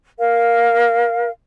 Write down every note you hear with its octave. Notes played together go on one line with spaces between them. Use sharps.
A#4 F5